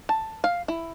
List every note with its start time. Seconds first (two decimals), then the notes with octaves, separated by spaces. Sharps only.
0.09 A5
0.44 F5
0.68 E4